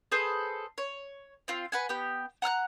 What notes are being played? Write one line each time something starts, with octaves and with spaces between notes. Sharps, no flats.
G#4 A4 B4 C5
C#5
C4 F4
B4 F#5 G#5
B3 G4
F#5 A#5 F6 F#6